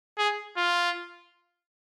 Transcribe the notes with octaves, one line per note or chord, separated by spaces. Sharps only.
G#4
F4